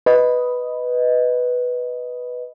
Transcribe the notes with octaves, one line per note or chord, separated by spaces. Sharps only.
B4 D#5